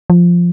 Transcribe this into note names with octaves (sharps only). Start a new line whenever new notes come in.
F3